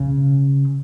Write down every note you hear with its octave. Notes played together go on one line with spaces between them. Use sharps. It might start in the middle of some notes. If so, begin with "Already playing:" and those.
Already playing: C#3